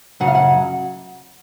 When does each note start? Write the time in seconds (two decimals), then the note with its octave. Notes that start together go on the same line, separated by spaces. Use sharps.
0.20 F#2 C#3 F#3 F#5
0.27 F5
0.35 F#5